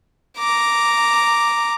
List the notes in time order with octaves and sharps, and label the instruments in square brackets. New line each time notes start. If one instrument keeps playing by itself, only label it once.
[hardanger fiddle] A#5 D6